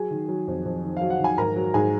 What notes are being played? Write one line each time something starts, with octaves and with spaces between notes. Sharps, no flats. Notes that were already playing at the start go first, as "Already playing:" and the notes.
Already playing: F#3 G#4 G#5
D#3
F#3
F2
F2
D#3
F#3 F5
F#5
D#3 G#5
G#2 A#4 A#5
F#3
G#2 G#4 G#5